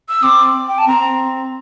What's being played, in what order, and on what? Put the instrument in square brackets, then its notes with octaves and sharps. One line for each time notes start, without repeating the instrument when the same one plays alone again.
[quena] E6
[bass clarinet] C4 [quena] D6
[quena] G5
A5
[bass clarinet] C4 [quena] A#5